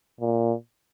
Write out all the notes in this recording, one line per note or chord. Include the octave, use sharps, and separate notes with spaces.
A#2